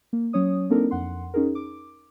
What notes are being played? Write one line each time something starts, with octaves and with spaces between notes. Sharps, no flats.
A#3
F#3 C#4 C#5 D#6
A#3 C4 D4 D#4 A4 A#4
F2 F#5 C6
C#4 D#4 G#4 A#4
D6